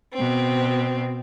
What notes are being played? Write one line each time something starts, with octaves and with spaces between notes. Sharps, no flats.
B2 C4